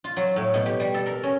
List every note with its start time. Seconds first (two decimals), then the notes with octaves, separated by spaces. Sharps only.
0.04 F4
0.17 F#3
0.36 A2
0.54 B2
0.66 G4
0.80 G3
0.94 A4
1.06 A#4
1.23 C#4